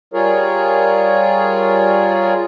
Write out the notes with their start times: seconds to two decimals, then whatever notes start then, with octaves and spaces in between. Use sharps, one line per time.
0.14 G3 F4 G#4 A#4 C#5